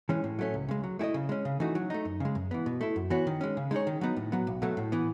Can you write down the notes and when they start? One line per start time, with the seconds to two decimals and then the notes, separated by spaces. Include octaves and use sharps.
0.09 E3 G#3 C#4
0.24 A2
0.39 F#3 A3 C#4
0.54 C#2
0.69 C#3 G#3
0.84 F#3
0.99 A3 E4 G#4 D#5
1.14 C#3
1.29 G#3 C#4
1.45 C#3
1.60 E3 A3 D#4 F#4
1.75 F#3
1.90 A3 D#4
2.05 F#2
2.20 C#3 G#3
2.35 F#2
2.51 E3 B3
2.66 B2
2.81 A3 E4
2.96 F#2
3.10 E3 B3 F#4 C#5
3.27 D#3
3.41 G#3 C#4
3.57 C#3
3.71 G#3 D#4 G#4 C#5
3.87 D#3
4.01 F#3 B3 D#4
4.17 A2
4.32 F#3 B3
4.47 B1
4.62 B2 F#3 A3
4.77 A2
4.92 E3 B3